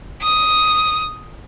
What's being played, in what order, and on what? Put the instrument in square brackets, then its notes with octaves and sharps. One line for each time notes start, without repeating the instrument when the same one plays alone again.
[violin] D#6